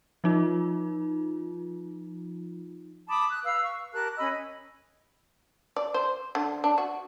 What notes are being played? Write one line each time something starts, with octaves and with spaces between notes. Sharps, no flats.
F3 D#4 F4
A5 B5 D6 D#6
F#6
B4 F5 E6
C#6
G4 A#4 A5 F#6
C#4 D#5 B5 E6
D5
C5
D3
D4
F#4